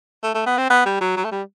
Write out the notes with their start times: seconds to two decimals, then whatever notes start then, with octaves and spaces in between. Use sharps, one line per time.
0.23 A3
0.35 A3
0.46 B3
0.58 C4
0.70 B3
0.86 G3
1.01 F#3
1.17 F#3
1.25 A3
1.32 G3